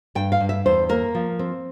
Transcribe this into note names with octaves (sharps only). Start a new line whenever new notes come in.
G2 G5
F5
G2
E5
E2 C5
A#3 A#4
F3
C4